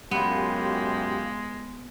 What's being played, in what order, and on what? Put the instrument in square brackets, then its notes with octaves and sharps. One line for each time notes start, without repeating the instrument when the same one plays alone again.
[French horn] F#2 [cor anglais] G#3 [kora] B3 [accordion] F4 G4